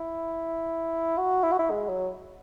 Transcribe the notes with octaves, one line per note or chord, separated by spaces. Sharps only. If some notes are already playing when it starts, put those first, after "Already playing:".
Already playing: E4
F#4
E4
F#4
E4
G#3
F#3